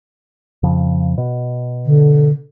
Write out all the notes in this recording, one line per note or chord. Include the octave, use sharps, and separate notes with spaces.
F2 C#3 F3
B2
D3